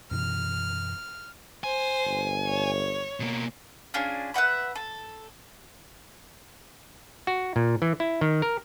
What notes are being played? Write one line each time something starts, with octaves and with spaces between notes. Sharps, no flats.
F#2 B2 E3 F6
C5 G#5
G1
C#5
B2 A#3
C#4 D4 F4 G#4
B4 E5 F#5 B5
A4
F#4
A#2
E3
E4
D#3
A#4